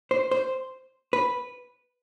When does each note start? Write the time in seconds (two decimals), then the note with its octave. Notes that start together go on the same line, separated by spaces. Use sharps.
0.11 C5
0.31 C5
1.13 B4